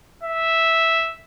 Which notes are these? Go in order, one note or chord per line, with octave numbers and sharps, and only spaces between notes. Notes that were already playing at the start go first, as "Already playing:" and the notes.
E5